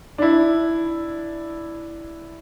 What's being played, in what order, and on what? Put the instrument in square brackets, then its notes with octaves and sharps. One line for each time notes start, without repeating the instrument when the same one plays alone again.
[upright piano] D4 E4